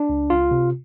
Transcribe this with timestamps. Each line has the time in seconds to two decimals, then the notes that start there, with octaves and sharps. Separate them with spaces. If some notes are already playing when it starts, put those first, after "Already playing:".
Already playing: D4
0.09 C#2
0.30 C#2 F4
0.51 C3